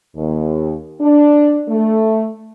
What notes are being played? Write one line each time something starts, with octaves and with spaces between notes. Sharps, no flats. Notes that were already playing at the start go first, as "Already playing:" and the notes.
D#2
D4
A3